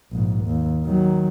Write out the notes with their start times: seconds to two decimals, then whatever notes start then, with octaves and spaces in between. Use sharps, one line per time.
0.12 A#1 G#2
0.45 D#2
0.84 D#3 F#3